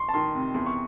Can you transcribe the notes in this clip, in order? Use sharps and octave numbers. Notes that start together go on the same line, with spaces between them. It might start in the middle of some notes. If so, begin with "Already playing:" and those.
Already playing: C6 C#6
A5
D#3 C6
C3
E2 C6
C#6